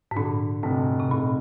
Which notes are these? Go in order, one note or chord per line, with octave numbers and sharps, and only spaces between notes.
G#2
A#2 D3
F1 G#2
C3
F1 A#2